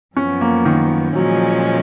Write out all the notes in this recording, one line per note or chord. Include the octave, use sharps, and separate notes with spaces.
F#2 F3 B3 C#4
A#3
D#3
A#2 F3 F#3 G#3 C#4